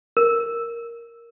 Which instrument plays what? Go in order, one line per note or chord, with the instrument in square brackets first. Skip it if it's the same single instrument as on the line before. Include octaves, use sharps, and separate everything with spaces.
[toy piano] A#4